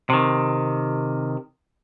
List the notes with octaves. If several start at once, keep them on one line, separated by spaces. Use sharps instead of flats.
C3 D#3